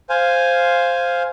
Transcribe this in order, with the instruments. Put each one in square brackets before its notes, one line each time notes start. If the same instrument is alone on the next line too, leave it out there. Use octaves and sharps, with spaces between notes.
[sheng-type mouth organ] C5 F5 G#5